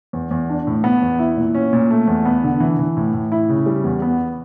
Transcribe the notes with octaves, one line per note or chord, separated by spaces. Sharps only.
E2
E2
D4
A2
B3
E2
E4
A#2
C#4
A#2
A3
E2
B3
D3
E3
E3
A2
A2
E4
C#3
G3
E2
B3